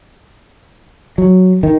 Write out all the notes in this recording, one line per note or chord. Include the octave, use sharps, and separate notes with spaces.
F#3
D#3